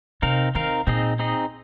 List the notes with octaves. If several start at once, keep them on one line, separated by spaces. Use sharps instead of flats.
C3 C4 D#4 A#4 F5
D#3 C4 D#4 A#4 F5
A#2 C4 D#4 G#4 D#5
C4 D#4 G#4 D#5